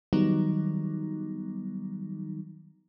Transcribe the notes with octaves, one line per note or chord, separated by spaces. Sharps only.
D#3 F#3 G3 B3 D#4